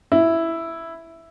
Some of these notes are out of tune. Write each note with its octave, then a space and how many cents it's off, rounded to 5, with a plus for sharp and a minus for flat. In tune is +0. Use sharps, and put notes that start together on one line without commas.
E4 +0